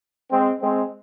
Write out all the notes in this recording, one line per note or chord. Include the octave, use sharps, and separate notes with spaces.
G#3 C4
G#3 C4